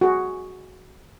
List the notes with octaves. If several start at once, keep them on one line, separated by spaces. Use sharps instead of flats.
F#4 G#4